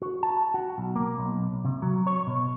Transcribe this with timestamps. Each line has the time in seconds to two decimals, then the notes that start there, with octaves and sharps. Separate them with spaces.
0.02 F#4
0.23 A5
0.54 F#4
0.78 B1
0.96 A#3
1.18 B1
1.65 C3
1.82 F#3
2.07 C#5
2.27 B2